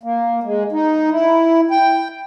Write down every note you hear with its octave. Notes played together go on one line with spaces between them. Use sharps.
A#3
G#3
D#4
E4
G5